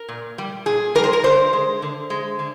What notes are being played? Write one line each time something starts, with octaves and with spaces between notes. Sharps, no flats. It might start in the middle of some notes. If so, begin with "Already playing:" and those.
Already playing: A#4
A#2
G3
A#2 G#4
G3 A#4
C5
A#4
D3 C5
G#3
D3
G#3
D3